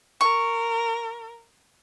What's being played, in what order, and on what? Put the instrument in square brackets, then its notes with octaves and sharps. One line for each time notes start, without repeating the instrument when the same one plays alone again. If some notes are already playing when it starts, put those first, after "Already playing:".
[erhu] A#4 [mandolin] C#6